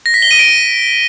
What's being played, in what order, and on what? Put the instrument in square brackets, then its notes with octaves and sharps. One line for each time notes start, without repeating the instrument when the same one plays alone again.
[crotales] A#6
B6
G7
D#7
D7